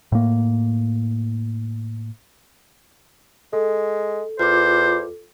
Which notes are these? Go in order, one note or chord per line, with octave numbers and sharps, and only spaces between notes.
A2 A#3
G#3 A4
E2 F4 C5 D6